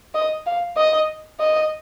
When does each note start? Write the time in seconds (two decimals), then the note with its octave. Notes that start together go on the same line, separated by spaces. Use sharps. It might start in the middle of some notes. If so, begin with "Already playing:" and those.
0.15 D#5
0.46 F5
0.77 D#5
1.40 D#5